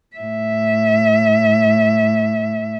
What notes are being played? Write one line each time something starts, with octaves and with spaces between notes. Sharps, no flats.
A2 E5